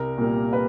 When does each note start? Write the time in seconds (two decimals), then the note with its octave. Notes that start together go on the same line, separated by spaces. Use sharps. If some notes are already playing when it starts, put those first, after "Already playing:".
Already playing: C2 A#4
0.17 A#2 G3 A#3
0.53 B4